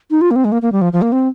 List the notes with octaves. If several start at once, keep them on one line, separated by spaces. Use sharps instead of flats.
D#4
F4
A#3
C4
G#3
A#3
A#3
G3
F3
F3
A#3
C4